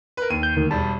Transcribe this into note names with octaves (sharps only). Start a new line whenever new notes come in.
A#4 B4
D#2 D#7
G6
D2 D#3
E1 G3 A5